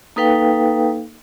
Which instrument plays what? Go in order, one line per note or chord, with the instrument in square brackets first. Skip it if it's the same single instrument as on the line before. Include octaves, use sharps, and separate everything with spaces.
[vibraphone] A#3 D#4 A4 B4 F5 G5